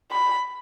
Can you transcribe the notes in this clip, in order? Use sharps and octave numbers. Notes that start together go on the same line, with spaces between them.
B5